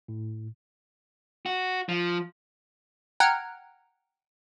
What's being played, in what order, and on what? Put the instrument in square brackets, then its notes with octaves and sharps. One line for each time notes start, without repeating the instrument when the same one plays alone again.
[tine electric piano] A2
[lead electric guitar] F#4
F3
[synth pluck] F#5 G5 A#5 F6 F#6 G#6